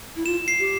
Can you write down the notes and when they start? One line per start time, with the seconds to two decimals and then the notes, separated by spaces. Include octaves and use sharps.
0.15 E4
0.25 F4 E7
0.48 C7
0.59 G4